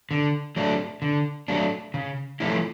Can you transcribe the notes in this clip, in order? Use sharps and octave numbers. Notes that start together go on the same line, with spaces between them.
D3
F#3 A3 D4
D3
F#3 A3 D4
C#3
F3 A3 C#4 E4